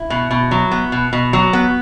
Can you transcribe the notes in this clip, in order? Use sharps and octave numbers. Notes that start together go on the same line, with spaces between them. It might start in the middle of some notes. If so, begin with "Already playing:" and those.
Already playing: E4
B2
B2
F#3
B3
B2
B2
F#3
B3